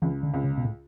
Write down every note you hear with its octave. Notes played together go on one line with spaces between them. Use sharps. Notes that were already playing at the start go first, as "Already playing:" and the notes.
C#2 E3
D3
C#2
C#3
B2
A2